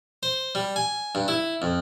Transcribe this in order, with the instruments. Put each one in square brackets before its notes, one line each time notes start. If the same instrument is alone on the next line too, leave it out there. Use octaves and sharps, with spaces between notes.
[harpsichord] C5
G3
G#5
G2
E4
F2